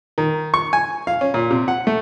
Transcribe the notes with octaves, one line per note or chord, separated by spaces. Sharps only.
D#3
C#6
G#5
F5
C#4
A#2
C3
F#5
A3